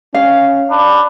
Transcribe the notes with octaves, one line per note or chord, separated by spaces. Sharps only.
C#4 F5
D4 B5